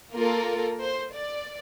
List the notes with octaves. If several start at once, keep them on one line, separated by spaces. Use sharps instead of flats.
A#3 F4 A4 A#4
C5
D5